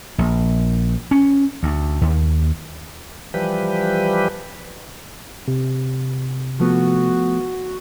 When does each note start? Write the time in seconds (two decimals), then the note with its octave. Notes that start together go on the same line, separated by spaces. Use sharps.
0.18 A#1
1.11 C#4
1.63 D2
2.01 D#2
3.34 E3 F3 G3 G4 B4
5.48 C3
6.60 F3 A3 B3 F#4